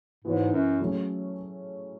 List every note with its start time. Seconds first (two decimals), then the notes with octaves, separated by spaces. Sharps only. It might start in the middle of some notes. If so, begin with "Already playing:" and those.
0.24 G#2 E3 B3 F#4 C#5
0.53 F#2
0.80 F#3 A3 C#4 G#4